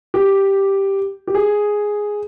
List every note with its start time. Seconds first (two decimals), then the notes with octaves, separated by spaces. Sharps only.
0.14 G4
1.27 G4
1.35 G#4